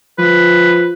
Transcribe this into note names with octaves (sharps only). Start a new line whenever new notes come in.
F3 B4